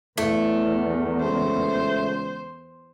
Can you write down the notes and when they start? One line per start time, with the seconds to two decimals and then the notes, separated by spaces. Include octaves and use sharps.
0.18 E2 A2 A3
1.21 C#2 C5